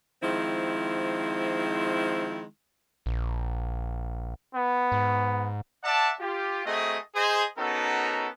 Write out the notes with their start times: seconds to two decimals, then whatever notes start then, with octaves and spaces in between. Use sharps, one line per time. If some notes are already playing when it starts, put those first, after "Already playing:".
0.23 D#3 F3 G#3 C4 E4
3.06 A#1
4.55 B3
4.92 G#2
5.84 D5 E5 F#5 A5
6.20 F4 G4
6.65 A3 C4 F#4 G#4 A#4 D#5
7.15 G#4 C5 D#5
7.57 B3 C#4 D#4 F#4 A4 A#4